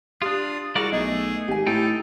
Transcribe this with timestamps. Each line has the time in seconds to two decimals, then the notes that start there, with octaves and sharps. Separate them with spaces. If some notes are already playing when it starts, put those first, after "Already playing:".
0.22 D4 F4 G4 F5 D#6
0.75 G3 E4 F#4 G#4 A#4 D5 F#5
0.92 B1 A3 G#4 D#5
1.48 G#1 G4 G#5
1.67 A2 D#4 G4 A4 G5